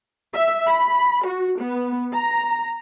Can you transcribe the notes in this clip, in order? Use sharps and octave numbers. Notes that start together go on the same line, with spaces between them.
E5
B5
F#4
B3
A#5